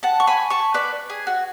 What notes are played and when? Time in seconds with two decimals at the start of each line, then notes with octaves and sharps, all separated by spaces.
0.03 F#5 A5
0.20 C#6
0.27 G#5 B5
0.50 A5 C#6
0.74 B4 D5
1.10 G#4
1.27 F#4